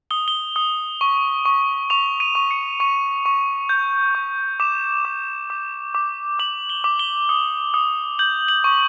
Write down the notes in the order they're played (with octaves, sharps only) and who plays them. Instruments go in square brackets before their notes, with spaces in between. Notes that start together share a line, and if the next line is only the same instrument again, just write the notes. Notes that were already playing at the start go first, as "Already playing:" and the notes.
[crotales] D#6 G7
G7
D#6
C#6
C#6
C#6 F7
D#7
C#6
C#7
C#6 D#7
C#6
G6
C#6
D6 E7
D6
D6
D6
D6 F#7
G7
D6
G7
D#6
D#6
G6 F#7
F#7
C#6